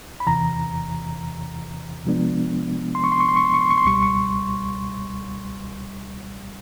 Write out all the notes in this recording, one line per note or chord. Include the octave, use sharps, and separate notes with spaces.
B5
E2 C3 E3 A#5
C3 F3 G#3 B3 D4
C6
C#6
C6
C#6
C6
C#6
C6
C#6
C6
C#6
C6
C#2 B2 G3 C#6
C6
C#6